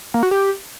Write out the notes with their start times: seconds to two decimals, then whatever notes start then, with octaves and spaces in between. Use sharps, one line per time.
0.14 A#3
0.23 F#4
0.31 G4